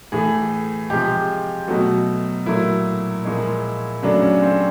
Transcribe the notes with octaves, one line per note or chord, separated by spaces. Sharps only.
A2 E3 A3 G#4
C3 F3 G#3 G4
B2 F#3 A3 F#4
A#2 F#3 A3 E4
A#2 F3 G#3
C#3 F#3 A3 D4
C#4
C4